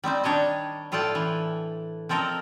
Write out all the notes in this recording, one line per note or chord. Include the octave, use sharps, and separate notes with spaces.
G3 C4 D#4 C5
D#3 D4 C#5 D#5 A5
A2 F4 A4 D5 G5 A5
E3
F3 C4 A4 A#4 D#5